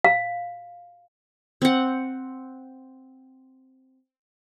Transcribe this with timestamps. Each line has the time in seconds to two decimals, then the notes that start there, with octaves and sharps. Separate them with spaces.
0.04 F5
1.62 C4 F#5